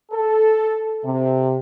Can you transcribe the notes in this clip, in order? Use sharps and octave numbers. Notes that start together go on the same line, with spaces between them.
A4
C3